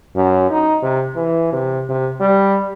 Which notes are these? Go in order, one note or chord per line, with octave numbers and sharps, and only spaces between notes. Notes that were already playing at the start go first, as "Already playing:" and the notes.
F#2
D#4
C3
E3
C3
C3
G3